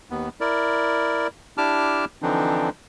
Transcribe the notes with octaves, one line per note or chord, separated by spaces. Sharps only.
D#2 B3
E4 A#4 D5
D4 E4 G4 A5 D6 F6
D3 E3 F3 C4 D4 D#4